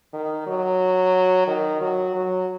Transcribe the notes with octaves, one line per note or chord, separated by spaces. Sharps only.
D#3
F#3
D#3
F#3
F#3